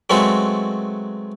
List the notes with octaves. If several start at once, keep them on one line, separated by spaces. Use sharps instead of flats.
F#3 G#3 A3 B3 C4 F#4